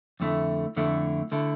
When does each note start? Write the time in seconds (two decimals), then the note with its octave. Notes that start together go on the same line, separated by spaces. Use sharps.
0.20 F2 D3 A3 E4
0.76 F2 D3 A3 E4
1.32 D3 A3 E4